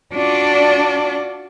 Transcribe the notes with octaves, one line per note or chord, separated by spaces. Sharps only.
D4 F4 F#4 D5